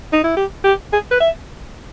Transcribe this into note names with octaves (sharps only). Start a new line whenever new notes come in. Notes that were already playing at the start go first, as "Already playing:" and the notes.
D#4
E4
G4
G4
G#4
B4
E5